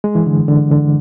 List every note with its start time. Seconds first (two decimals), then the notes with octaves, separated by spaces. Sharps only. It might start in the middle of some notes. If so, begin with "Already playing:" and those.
0.04 G#3
0.15 E3
0.26 D3
0.48 D3
0.71 D3